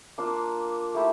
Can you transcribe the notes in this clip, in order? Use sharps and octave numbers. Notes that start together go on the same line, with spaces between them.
A#3 D4 F4
A3 E4 G4